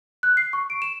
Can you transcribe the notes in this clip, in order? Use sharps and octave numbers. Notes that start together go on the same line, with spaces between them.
F#6
C7
C#6
D7
E7